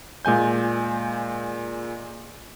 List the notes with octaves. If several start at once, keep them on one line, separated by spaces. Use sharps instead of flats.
A#2 G#3 G#5 G6